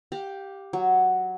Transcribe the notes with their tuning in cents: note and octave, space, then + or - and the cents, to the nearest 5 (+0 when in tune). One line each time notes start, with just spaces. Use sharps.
G4 +0 F5 +35
F#3 +0 F#4 +0